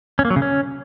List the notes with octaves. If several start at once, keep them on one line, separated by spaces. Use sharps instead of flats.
C#4
A#3
F#3
C#3
C#4